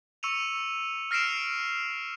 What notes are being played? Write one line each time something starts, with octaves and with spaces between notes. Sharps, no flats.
C#6 E6 C#7 D#7 F7
F6 A#6 C7 D7 E7 F7